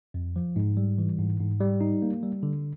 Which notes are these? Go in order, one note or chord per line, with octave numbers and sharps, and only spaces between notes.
F2
F3
G#2
G3
E3
G#2
G#2
G3
D#4
A#3
G3
D3